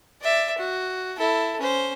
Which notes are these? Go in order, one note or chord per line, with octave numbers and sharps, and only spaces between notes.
D5 E5
F#4
E4 A4
C#4 C5